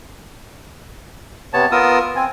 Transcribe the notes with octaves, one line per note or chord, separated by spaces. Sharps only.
C3 B3 C#5 A5
B3 F4 A#4 D#6 E6
C4 G#5